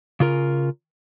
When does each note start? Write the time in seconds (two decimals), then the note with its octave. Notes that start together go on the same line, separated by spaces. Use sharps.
0.20 C#3 F4 A#4